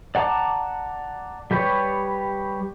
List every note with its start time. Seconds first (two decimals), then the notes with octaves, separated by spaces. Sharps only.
0.15 D5 F#5 A5 A#5 D6
1.51 G3 G4 B4 C#5